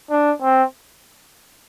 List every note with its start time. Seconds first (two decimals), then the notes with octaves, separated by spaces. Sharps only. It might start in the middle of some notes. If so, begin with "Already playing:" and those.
0.10 D4
0.41 C4